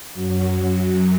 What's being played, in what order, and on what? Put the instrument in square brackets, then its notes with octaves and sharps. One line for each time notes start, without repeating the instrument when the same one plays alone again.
[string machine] F#2 F#3